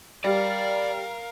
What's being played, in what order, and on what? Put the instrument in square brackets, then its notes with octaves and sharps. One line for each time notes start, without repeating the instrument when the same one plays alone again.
[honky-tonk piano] G3 [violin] A#4 F5 [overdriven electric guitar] D5